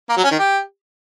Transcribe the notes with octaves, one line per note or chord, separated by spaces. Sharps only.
A#3
F#3
C#4
D#3
G4